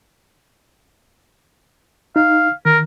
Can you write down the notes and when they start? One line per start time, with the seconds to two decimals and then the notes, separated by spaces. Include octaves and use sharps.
2.16 D#4 F5
2.65 D#3 A#4